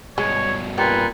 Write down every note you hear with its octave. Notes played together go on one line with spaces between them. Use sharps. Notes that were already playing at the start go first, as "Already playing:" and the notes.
G2 B2 G#3 C#5
A#2 G4 B4